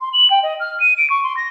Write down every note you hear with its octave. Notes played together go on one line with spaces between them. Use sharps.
C6
F#7
G5
D#5
F6
D#7
D7
C#6
C6
A#6